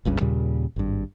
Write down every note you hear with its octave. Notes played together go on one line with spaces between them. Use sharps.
F#1 C#2 G2 C#3
D#2 A#2 C#3 G3
G#1 G2